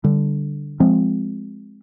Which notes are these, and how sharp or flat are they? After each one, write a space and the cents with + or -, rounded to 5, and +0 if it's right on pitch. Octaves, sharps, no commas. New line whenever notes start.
D3 -5 G3 +0
F3 +0 G#3 +0 C4 +0